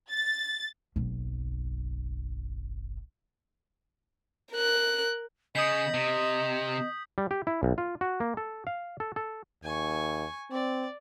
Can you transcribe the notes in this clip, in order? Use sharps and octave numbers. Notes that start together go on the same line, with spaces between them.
A6
F#1 B1
A#4 F#6
C#3 D#5 D#6 G6 B6
C3
G3
G4
E4
B1
F4
F#4
A#3
A4
F5
A4
A4
D#2 G#5 C#6
C4 D5